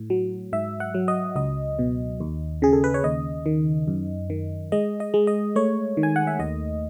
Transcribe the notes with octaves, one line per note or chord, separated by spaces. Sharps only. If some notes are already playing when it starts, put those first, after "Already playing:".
Already playing: A2
F#3
G#2 E5
F#5
F#3
D#5
C#2 D#5
B2
D#2
C#3 G#4
A4
B4
C#5
D#2 D#5
D#3
F#2
D#3
G#3 D#5
D#5
G#3
D#5
A3 C#5
D#3
G#5
F#5
E5
D#2 D#5